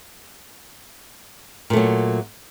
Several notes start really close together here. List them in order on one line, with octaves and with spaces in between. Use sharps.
A#2 A3 F#3